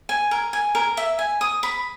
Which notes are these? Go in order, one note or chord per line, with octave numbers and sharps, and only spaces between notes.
G#5
A#4
G#5
A#4
E5
G#5
D#6
B5